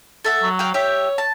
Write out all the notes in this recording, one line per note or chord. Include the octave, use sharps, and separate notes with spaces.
A4 E5 F#5
F#3
F5 G5
G4 C#5 E5
A5